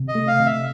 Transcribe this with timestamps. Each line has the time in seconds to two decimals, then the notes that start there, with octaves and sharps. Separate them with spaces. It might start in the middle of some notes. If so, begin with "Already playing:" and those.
Already playing: C3
0.08 D#5
0.15 A3
0.28 F5
0.40 C3
0.46 E5